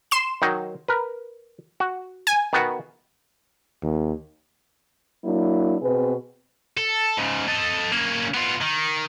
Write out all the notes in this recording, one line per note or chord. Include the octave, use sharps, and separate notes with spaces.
C6 E7
D#3 F#3 D#4
A#4 B4
F#4
G#5
D#3 B3 F#4
D#2
F#3 A#3 D4 E4
B2 C4 G#4 B4
A4
G#2 C#3
A4 D#5
A#3 C#4
B3 F4
D#3